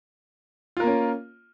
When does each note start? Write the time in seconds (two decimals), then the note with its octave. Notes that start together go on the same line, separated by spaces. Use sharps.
0.77 F4
0.80 A#4
0.83 A#3
0.87 C#4